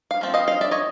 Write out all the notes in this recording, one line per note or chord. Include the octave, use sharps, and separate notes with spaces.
F5
F3 A3 C4
D#5 F5
D#5 F5
D5 E5
C#5 D#5